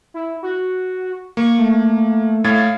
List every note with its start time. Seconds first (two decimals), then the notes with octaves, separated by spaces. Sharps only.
0.14 E4
0.43 F#4
1.37 A#3 C#6
1.59 A3
2.44 A2 F5 G#6 A6